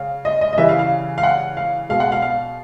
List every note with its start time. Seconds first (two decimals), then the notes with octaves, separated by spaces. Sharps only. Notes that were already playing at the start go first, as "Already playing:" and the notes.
Already playing: C#3 F5
0.25 D#5
0.41 D#5
0.53 D#5
0.57 C#3 E3 G3 E5
0.69 F5
0.79 F5
1.18 F5
1.23 F#5
1.57 F5
1.89 B2 G#3 F5
2.00 F#5
2.12 F5
2.22 F5